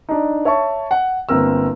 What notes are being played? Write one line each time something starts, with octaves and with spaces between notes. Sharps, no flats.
D4 D#4
C#5 E5 A5 C#6
F#5
G1 A#3 C4 A#4 E6